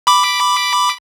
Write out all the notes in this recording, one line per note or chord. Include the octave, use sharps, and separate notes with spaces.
B5 D6